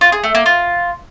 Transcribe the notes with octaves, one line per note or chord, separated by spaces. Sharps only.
F4
G#4
A3
A#3
F4